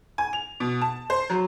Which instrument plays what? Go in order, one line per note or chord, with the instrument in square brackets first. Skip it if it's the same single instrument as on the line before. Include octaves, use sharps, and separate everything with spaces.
[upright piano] G#5
F7
B2
A5
C5
F#3